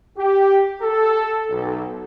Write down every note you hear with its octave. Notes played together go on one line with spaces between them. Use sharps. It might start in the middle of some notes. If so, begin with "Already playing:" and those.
G4
A4
B1